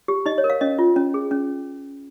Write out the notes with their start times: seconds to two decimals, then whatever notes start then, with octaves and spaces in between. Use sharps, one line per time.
0.08 G4
0.26 D#4 D#5
0.38 C#5
0.44 A#4
0.50 F5
0.61 C#4 D#5
0.79 F4
0.96 C#4
1.14 G#4
1.31 C#4